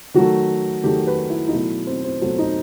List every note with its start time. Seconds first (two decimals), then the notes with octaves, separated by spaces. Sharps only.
0.14 D#3 F#3 A3 F#4
0.84 D#3 F#3 A3 G4
1.07 B4
1.29 E4
1.48 D#4
1.53 B2 F#3 A3 E4
1.87 C4
2.04 C4
2.21 B2 F#3 A3 C4
2.39 D#4